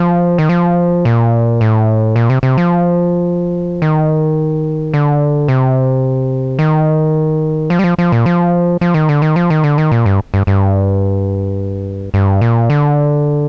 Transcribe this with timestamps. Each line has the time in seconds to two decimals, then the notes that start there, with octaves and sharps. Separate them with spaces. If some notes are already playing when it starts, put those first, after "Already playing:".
Already playing: F3
0.38 D#3
0.49 F3
1.05 A#2
1.61 A2
2.16 A#2
2.30 C3
2.43 C3
2.58 F3
3.82 D#3
4.94 D3
5.48 C3
6.59 D#3
7.70 F3
7.79 G3
7.84 F3
7.98 F3
8.12 A#2
8.26 F3
8.81 F3
8.94 D#3
9.09 D3
9.22 D#3
9.36 F3
9.50 D#3
9.64 D3
9.78 D#3
9.92 A#2
10.06 G2
10.34 G2
10.47 G2
12.14 G2
12.41 A#2
12.70 D3